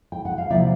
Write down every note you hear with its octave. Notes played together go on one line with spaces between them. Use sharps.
G5
F#5
F5
C3 F3 A#3 D5 E5